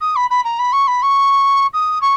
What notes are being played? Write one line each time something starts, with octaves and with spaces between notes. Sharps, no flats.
D#6
B5
B5
A#5
B5
C#6
B5
C#6
D#6
C#6